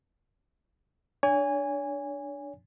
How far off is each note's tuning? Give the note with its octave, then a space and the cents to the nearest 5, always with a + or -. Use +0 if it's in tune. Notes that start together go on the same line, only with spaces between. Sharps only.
D4 +5 C#5 +40 G#5 -15